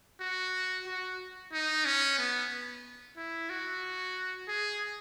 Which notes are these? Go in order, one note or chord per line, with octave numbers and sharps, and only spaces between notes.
F#4
F#4
D#4
C#4
B3
E4
F#4
G#4